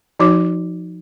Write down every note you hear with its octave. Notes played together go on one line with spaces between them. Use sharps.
F3 D#4 F#4 C#5 D6